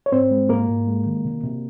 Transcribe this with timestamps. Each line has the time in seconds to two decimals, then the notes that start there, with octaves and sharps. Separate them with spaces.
0.06 C#5
0.12 G#2 C4 C5
0.31 G#3
0.49 G#2 A#3 A#4
0.68 G#2
0.87 G#3
1.06 D#3
1.24 C3
1.44 C3